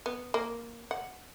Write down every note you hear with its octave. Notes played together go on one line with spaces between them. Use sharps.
B3
A#3
F#5